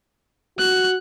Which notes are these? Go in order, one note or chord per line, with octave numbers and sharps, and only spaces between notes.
F#4 F#6